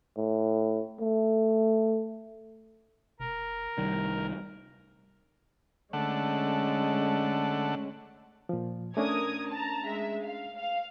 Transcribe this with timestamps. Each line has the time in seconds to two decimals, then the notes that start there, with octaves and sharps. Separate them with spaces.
0.17 A2
1.00 A3
3.20 F1 A#4
3.78 C2 D#3 G3
5.93 D3 G#3 A3 C#4 F#5
8.49 A#2 F3
8.97 A3 C#4 D4 A#4 D#6 G#6
9.51 A5 A#5
9.86 G#3 E5
10.25 F5
10.58 F5